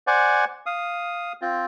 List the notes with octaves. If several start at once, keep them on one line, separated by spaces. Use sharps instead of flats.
C5 D5 F#5 G#5
F5 D#6
C4 F4